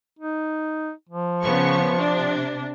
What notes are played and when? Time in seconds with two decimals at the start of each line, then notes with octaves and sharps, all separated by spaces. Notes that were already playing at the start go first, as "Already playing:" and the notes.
0.19 D#4
1.09 F3
1.43 C#3 B3 C#6
1.95 C3 D4